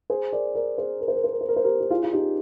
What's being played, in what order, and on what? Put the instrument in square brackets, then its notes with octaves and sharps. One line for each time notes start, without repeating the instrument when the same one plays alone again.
[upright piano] G#4 C5
A#4 D5
A#4 D5
G#4 C5
A#4
C5
A#4
C5
A#4
C5
A#4
C5
G4 A#4
G4
F4 G#4
F4
D#4 G4